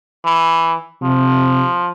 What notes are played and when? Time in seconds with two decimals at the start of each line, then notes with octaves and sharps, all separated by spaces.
0.25 E3
1.02 C3 F3